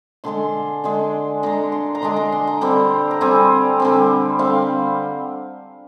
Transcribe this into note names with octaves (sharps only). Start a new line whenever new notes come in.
D3 G#3 D4 C6
D3 G#3 D4
D3 G#3 D4 A#5
C6
A#5
D3 G#3 D4 C6
A#5
C6
A#5
D3 G3 C4
A#5
D3 G3 C4 G#5
D3 G3 C4
D3 G3 C4 F5